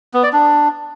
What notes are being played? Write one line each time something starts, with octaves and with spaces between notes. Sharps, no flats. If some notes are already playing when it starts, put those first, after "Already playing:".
B3
D5
D4